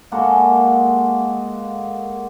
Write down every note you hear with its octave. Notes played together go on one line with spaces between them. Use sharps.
G#3 A#3 F#4 A4